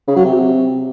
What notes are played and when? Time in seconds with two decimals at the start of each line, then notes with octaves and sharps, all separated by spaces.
0.08 C#3
0.16 F#3
0.24 C3